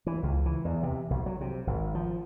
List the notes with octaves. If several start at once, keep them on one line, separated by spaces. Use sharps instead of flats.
E3
C#2
E3
E2
C3
B1
F#3
C3
G#1
F3